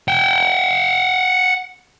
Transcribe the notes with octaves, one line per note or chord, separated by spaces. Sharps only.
F#5 G5